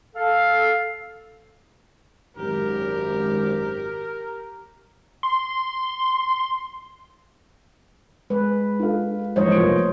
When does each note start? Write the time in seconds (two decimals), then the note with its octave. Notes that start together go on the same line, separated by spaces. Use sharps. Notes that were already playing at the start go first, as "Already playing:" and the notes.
0.15 A4 F5
2.37 G#1 F#2 G4 A#4
5.23 C6
8.30 G#3 B4
8.80 F4 A4 F5
9.36 A#1 G#2 E3 C5 C#5 D#5
9.52 F1 F3 A#3 D7